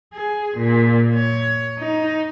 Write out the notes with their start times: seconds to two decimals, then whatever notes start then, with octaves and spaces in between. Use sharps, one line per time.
0.13 G#4
0.57 A#2
1.14 C#5
1.79 D#4